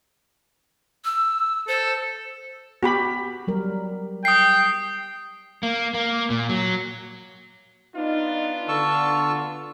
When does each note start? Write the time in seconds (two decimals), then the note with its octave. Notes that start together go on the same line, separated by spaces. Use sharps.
1.05 E6
1.68 A4 C5
2.83 B3 F#4 G4 B5
3.47 F#3 G3 A#4
4.25 G5 D#6 C7
5.63 A#3
5.94 A#3
6.30 A#2
6.49 F#3
7.95 B3 D4 D#4 F4
8.68 D3 A5 C#6 E6